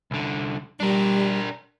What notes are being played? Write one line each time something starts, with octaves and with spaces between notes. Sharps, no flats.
C2 D3
G3 D4 A#4